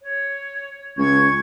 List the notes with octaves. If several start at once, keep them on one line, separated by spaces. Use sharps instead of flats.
C#5
C#2 C#6 G#6